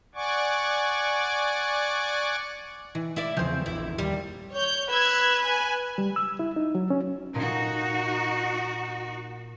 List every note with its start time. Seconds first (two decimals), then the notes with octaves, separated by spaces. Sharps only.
0.15 D5 F#5 G#5 C#6 D6
2.95 E3
3.16 E4 D5
3.37 E2 C#3 F3 C4
3.66 A#1 F2 E3 E4
3.98 D#2 G3
4.53 C#5 G6
4.91 B4 E6 G#6
5.45 G#5
5.98 G3
6.16 E6
6.39 E4
6.56 D#4
6.75 F#3
6.90 C#4
7.35 A#2 D#4 F#4